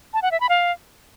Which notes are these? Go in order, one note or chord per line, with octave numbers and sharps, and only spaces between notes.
A5
F#5
E5
B5
F5